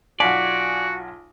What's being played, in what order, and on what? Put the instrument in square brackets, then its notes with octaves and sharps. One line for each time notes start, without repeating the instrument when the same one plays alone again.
[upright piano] B1 F4 G#5 [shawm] F#4 [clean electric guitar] D5 [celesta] F#5 B6